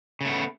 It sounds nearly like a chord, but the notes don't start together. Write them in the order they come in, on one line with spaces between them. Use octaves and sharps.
C#3 A3 B3